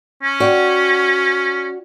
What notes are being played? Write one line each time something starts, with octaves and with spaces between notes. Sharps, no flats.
C#4
F#4 D5 G5